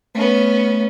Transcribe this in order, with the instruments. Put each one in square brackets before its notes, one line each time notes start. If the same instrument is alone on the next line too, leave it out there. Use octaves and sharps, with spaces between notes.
[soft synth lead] A3 [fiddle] B3 C#4